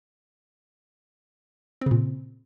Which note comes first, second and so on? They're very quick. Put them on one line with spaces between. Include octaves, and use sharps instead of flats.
C4 C#3 A#2